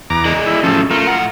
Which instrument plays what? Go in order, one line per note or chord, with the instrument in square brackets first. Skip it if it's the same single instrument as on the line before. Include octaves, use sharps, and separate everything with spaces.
[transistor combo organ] E2 A#5 D6
[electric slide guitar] G#4 D5 D#5
[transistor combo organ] E4
[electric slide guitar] A2 F#3 C#4 [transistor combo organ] F3 A4
[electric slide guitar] A3 [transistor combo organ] F4 A#4
[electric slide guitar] A2 F#5